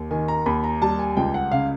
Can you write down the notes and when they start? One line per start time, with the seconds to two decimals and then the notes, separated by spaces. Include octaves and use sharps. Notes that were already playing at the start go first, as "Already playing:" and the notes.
Already playing: D#2
0.11 D#3 G#5
0.28 A#5
0.46 D#2 B5
0.64 A#5
0.82 G3 A5
0.99 G#5
1.17 C#2 G5
1.34 F#5
1.52 C#3 F5